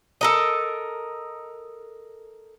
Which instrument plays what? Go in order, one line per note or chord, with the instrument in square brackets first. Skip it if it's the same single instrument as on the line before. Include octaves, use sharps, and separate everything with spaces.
[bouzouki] A4 A#4 D#5